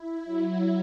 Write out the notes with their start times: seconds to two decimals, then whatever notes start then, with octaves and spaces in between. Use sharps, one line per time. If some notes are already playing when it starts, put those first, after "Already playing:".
Already playing: E4
0.24 F#3